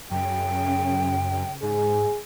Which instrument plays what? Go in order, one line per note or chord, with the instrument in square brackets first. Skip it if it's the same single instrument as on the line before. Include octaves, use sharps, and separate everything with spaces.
[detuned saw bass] F#2 [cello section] C#3 [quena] G5
[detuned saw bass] G#2 [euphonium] G#4